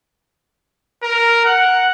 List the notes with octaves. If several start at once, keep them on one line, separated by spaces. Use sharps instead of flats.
A#4
F#5